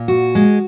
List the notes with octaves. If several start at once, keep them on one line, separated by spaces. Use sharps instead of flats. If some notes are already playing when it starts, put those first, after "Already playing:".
Already playing: A#2
F#4
G#3